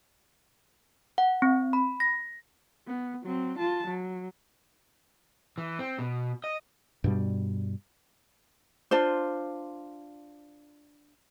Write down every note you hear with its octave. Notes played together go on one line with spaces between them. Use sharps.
F#5
C4
B5
A#6
B3
F#3 C4
F4 A5
F#3
E3
C4
B2
D#5
G2 B2 G3
D4 F4 C5